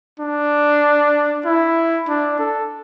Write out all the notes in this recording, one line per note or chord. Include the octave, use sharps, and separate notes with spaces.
D4
E4
D4
A4